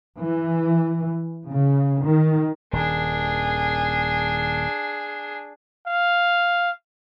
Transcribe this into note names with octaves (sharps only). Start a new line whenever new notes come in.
E3
C#3
D#3
D#1 D#3 D4 G#4
F5